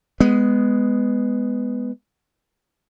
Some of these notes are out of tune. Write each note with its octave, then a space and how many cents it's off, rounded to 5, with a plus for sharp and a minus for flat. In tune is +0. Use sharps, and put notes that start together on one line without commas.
G#3 +0 B3 +5